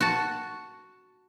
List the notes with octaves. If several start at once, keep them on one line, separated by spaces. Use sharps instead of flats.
F#4 F#5 A5